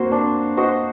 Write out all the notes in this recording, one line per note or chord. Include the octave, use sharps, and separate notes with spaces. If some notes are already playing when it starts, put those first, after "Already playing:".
Already playing: A#3 C4 F#4 C5
D4
F#4 C5 D#5